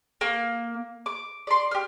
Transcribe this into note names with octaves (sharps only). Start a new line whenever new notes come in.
A#3
D6
D5 C6
G4 F6